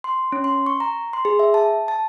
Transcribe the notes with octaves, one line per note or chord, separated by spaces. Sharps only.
C6
C#4
C6
C#6
A#5
C6
G#4
E5
A5
A5